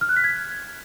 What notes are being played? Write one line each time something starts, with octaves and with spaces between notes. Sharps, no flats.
F6
F#6
B6
G#6